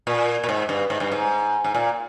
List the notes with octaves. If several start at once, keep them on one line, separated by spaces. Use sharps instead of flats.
A#2
A#2
G#2
G2
G#2
G2
G#2
G#2
A#2